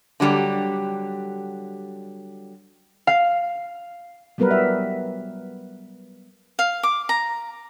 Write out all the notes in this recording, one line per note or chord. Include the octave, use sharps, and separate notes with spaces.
D3 F#3 G3 G4
F5
F#3 G3 B3 A#4 B4
E5
F5
D6
A#5